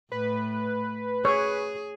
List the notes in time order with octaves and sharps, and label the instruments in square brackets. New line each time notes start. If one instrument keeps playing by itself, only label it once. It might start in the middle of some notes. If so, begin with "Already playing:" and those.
[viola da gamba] A2 [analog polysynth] B4
[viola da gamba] G#4 [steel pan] C#5